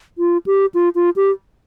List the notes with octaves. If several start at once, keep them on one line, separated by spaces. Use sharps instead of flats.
F4
G4
F4
F4
G4